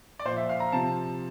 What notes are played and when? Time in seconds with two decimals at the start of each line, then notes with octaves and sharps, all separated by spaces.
0.19 D5
0.25 A#2 F3 C5
0.37 E5
0.49 F5
0.60 A#5
0.72 C3 F3 A5